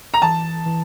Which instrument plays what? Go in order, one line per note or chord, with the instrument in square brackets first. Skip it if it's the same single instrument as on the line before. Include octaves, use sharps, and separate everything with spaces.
[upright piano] A#5
[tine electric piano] E3 [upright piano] A5
[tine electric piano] E3